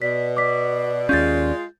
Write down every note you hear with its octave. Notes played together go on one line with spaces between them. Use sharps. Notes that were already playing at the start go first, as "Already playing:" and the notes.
B2 D5 B6
D5 D6 B6
D#2 G#3 C#4 F4 G6 A6